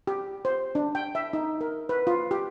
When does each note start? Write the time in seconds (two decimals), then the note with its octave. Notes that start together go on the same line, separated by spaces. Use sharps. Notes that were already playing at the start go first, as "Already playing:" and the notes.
0.07 G4
0.45 C5
0.75 D4
0.95 G5
1.15 E5
1.33 D#4
1.61 A#4
1.89 B4
2.07 F4
2.31 G4